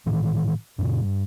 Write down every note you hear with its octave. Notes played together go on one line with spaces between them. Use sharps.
A2 D#3 E3
F#2 A#2 C#3
G2